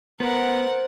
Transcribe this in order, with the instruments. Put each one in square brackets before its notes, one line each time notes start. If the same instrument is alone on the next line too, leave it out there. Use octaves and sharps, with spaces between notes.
[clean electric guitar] B3 [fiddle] A#4 F#5 [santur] C5